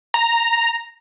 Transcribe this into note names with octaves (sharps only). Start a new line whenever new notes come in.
A#5